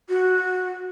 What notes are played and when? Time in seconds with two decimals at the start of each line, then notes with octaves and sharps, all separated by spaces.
0.09 F#4